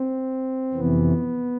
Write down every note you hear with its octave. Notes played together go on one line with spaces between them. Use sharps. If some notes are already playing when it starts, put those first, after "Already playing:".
Already playing: C4
F2 C3 E3 B3